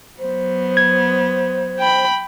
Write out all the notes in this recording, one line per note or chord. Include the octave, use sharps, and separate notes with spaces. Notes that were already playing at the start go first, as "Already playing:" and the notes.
F#3 B3 C5
G#6
G5 B5